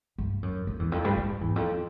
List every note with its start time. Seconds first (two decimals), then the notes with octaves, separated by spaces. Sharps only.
0.18 G2
0.43 F#2
0.67 F2
0.79 E2
0.92 F2
1.04 G2
1.17 G#2
1.41 E2
1.56 F2